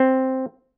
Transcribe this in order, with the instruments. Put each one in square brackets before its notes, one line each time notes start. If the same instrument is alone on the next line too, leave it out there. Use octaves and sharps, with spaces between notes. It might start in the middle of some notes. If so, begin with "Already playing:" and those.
Already playing: [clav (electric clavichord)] C4